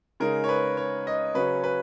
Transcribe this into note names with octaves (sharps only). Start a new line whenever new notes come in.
C#3 G#3 D#4 A#4
C#5
B4
C#5
D#5
C#3 F#3 C#4 B4
B4